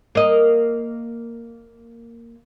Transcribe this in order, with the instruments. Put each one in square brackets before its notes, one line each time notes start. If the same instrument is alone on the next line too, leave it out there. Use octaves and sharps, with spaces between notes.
[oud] A#3 D#5